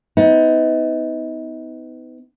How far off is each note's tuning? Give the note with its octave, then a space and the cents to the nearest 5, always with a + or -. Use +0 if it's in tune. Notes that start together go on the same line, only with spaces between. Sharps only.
B3 +35 D#4 +35